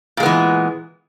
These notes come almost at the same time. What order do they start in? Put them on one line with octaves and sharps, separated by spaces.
A#2 G#3 B3 E3